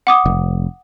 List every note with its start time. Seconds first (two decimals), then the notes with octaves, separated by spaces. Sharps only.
0.07 F#5 D6 D#6
0.26 F1